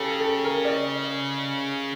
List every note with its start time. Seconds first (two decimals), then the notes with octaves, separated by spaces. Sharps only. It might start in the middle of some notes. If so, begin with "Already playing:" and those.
Already playing: C#3 G4 A4
0.19 A4
0.45 A#4
0.65 D5
0.70 D#5